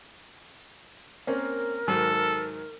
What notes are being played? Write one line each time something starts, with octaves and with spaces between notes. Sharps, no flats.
A#3 C4 C#4 A#4
G#2 D#3 F#3 A4